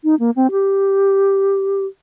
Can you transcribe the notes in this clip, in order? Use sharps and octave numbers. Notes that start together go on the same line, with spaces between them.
D#4
A#3
C4
G4